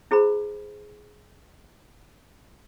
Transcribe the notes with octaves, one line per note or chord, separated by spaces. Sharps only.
E4 G#4 C5 B5